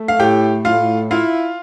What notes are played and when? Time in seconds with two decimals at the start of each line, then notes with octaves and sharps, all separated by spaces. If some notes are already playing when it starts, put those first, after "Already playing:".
Already playing: A3
0.08 F5
0.19 A2 G4 G5
0.65 A2 F4 F5
1.10 E4 F4 F5